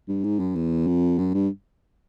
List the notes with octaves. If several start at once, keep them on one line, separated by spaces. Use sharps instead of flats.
G2
G#2
F#2
E2
F2
F#2
G2